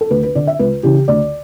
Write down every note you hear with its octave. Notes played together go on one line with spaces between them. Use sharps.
A4
D2 B4
B4
D3 D5
E5
C#2 B4
C#3 E3 G4
D2 D5